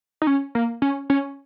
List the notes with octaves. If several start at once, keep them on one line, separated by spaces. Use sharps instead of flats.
D#4
C#4
A#3
C#4
C#4